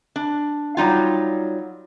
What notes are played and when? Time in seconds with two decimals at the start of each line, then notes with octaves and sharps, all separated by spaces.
0.16 D4
0.77 F#3 G3 D#4 F4